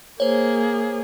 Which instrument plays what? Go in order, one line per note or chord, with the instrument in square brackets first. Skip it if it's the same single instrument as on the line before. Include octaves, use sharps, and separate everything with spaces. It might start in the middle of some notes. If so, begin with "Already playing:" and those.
[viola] A#3 G#4 [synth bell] C5 C#5